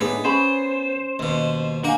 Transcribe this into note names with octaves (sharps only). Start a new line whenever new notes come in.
A2 B3 D4 D#4 G#4
C#4 G#4 C5 B5
D#2 B2
A#3 D4 F#4 F5 G#5